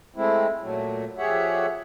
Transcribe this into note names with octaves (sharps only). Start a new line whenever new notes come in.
G#3 A3 C4 E4
A#2 F#3 A3
F2 G4 G#4 C#5 E5 F#5